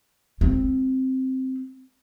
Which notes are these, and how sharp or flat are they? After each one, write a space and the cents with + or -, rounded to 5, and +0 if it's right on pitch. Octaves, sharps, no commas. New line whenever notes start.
G#3 +0 C4 +0